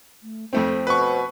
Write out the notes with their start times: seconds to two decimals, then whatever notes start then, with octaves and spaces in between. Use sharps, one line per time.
0.23 A3
0.53 F2 A3 C4 C5
0.87 B2 B4 C#6